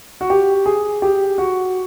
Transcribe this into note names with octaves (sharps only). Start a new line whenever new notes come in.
F#4
G4
G#4
G4
F#4